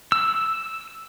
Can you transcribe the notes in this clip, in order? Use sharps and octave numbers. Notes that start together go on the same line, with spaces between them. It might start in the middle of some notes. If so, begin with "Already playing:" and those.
E6